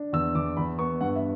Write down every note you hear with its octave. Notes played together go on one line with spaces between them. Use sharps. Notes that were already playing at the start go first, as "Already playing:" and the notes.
Already playing: D4
E2 E6
E2 D6
E2 B5
B3 C#6
G2 F#5
E5